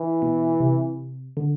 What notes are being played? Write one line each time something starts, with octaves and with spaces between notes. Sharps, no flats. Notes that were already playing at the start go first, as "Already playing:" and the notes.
Already playing: E3
B2
C3
D3